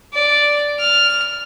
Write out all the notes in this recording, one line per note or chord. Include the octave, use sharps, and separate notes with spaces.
D5
F6